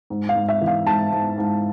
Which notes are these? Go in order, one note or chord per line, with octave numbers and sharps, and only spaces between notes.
G#2
F5
G#2
E5
E3
F5
G#2 A5
G#2
G#2